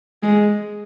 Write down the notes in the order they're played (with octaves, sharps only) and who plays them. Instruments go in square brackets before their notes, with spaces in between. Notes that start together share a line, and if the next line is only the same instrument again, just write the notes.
[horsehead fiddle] G#3